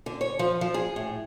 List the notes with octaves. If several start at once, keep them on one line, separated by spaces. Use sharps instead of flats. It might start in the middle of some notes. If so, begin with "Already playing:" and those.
D3
C#5
F3
F3
G#4
A2